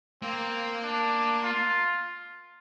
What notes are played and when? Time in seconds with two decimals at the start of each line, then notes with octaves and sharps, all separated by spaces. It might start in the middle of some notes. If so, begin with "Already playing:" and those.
0.23 A#3 C4
0.83 D4
1.43 F4